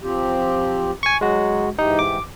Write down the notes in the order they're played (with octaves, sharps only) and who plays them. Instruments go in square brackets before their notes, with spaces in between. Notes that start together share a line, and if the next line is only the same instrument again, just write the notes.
[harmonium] F3 C4 G4
[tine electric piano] G#5 C#6
[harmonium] F#3 D#4 [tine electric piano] G#3 F#4
[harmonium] G#2 E3 G4 [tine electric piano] D#4
[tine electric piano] D6